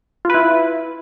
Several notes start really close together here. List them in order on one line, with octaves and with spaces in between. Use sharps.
F4 B4 E4